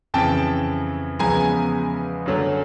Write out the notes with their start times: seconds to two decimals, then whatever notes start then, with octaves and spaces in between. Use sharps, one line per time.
0.14 F2 C#3 E3 G5 A5
1.19 E2 C#3 F3 G#3 B3 G#5 A#5
2.26 F#2 D3 F#3 A3 C#4